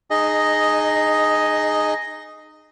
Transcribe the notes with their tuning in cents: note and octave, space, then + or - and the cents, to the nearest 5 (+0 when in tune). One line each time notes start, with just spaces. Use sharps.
D#4 -25 G#4 +0 D#5 +0